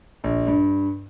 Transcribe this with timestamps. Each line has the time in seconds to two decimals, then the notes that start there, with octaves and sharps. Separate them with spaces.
0.24 A#1
0.47 G2